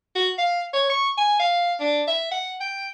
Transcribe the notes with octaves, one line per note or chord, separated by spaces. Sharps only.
F#4
F5
C#5
C#6
G#5
F5
D4
E5
F#5
G5